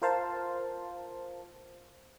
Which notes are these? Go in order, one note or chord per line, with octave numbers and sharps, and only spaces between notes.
F4 A#4 C5 F5 A5